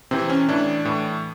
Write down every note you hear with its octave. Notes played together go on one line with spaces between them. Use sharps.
C3 E3 C4
C#4
A2 E3 D4
A2 E3